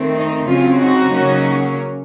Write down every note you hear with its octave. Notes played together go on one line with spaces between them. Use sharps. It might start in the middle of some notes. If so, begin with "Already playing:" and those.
Already playing: D#3 A3 C4
D#4
C#3 F#3 C4 C#4 F4
D#4 F#4
C#3 F#3 A#3 C#4